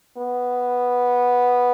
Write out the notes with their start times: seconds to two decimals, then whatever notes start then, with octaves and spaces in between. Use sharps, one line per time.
0.18 B3